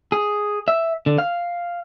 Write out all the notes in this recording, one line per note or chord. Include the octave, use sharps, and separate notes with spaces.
G#4
E5
D3
F5